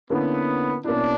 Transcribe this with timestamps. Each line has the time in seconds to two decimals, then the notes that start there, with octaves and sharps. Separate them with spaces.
0.10 D3 A#3 B3 C#4 E4
0.84 B2 A#3 C#4 D4 E4